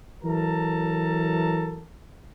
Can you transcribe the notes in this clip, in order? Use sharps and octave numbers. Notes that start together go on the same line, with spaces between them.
E3 F#3 A4 A#4 A5 A#5